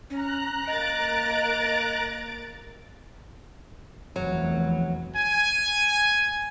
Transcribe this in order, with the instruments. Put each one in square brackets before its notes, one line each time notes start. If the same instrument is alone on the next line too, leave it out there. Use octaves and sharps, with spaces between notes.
[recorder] C#4 [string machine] A#5 F#6
[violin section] A#3 A6 D7 [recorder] D#5
[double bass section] F1 E2 E3 [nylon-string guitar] F#3
[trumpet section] G#5